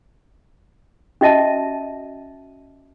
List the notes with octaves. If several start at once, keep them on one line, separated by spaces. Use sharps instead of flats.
C#4 F#4 D#5 E5 A5